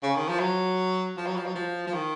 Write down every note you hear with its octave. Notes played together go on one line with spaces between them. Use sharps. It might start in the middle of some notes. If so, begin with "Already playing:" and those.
C#3
D#3
F3
F#3
F3
F#3
F3
F#3
F3
F3
D#3